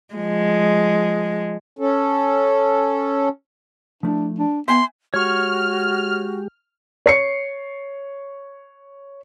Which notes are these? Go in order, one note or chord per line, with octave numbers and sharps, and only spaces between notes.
F3 G#3
C#4 A4
F3 A3 D4 E4
D4
B3 E5 G5 G#5 C6
G#3 F#4 G4 C#5 C#6 F6
C#5 C7 C#7